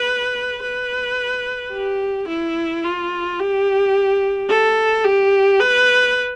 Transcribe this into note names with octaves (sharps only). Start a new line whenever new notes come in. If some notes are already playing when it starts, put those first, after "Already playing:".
Already playing: B4
B4
G4
E4
F4
G4
A4
G4
B4